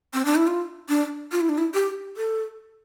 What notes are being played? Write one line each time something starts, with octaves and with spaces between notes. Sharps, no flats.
C4
D4
E4
F4
D4
F4
E4
D4
E4
G4
A4